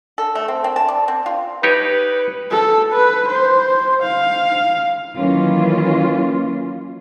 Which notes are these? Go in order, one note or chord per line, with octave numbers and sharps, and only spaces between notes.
A4
A3
C4
C4
A5
D5
C4
F4
D#4 G4 B4 C#5
A4
B4
C5
F5
D#3 E3 F#3 A#3 C#4 F4